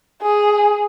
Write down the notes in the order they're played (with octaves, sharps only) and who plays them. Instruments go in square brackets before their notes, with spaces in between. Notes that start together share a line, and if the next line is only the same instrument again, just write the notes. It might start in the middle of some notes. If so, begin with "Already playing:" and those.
[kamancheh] G#4